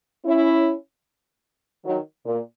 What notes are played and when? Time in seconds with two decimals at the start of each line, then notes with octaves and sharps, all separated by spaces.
0.25 C#4 E4
1.85 D#3 F#3
2.26 A#2